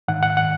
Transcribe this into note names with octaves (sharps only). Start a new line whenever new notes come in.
G#2 D#3 F#5
F#5
F#5